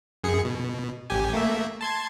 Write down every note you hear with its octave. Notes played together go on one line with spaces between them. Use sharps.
F#2 G#4 C#7
B2
A1 G4 G#5
A3 A#3 E5
A5 C6 G#6